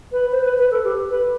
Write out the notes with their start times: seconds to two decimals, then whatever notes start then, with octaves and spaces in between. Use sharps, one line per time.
0.12 B4
0.32 C5
0.45 B4
0.58 B4
0.71 A4
0.84 G4
1.10 B4